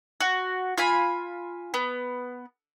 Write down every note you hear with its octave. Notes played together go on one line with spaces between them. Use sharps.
F#4
F4 G#5 B5
B3